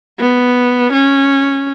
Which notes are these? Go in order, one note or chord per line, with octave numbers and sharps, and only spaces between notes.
B3
C#4